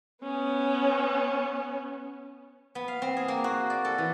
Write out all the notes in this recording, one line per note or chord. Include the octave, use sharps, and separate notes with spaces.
B3 C#4
B3
F5
C4
G#4
A#3
F#4
D5
A4
E3